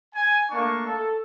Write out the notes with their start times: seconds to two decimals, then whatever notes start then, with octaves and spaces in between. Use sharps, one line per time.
0.15 G#5
0.50 A3 A#3 D4 C#6
0.86 A4